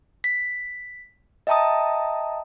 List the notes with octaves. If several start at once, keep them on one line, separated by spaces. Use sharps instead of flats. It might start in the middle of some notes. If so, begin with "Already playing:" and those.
B6
D#5 E5 G5 A5 A#5 D#6